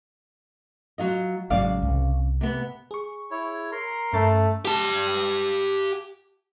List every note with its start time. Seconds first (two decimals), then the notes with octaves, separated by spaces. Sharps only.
0.98 F#3 F4 D#5
1.50 A1 G#2 C#3 F#3 D5 F5
1.82 C2
2.41 C3 B3
2.91 G#4 C#6
3.31 E4 C#5
3.72 A#4 A#5 C6
4.13 G2 A3 C#4 A6
4.65 G4 A5